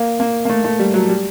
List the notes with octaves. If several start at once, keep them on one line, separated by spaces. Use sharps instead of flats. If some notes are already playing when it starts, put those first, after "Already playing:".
Already playing: A#3
A#3
A#3
A3
A3
G3
F#3
G3